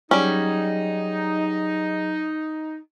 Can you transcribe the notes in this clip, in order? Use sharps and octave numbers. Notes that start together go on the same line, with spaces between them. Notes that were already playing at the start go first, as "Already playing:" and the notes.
F#3 G3 C#4 D#4 G#4